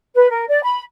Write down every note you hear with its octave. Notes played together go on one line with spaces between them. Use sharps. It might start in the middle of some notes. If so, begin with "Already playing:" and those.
B4
A#4
D5
B5